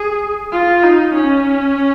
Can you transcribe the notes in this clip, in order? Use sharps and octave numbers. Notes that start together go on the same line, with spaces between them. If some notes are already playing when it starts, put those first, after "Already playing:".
Already playing: G#4
F4
D#4
C#4